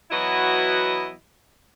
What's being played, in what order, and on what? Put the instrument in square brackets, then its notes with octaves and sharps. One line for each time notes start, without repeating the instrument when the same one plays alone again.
[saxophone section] E3 F#3 B3 E4 F#4 D#5